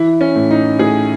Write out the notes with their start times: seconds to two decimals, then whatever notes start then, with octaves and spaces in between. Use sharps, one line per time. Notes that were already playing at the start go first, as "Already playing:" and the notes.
Already playing: E3 E4
0.21 C#4
0.36 A2
0.51 D#4
0.79 A2 G#4